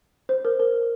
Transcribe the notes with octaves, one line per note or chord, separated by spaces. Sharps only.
C5
A#4
A#4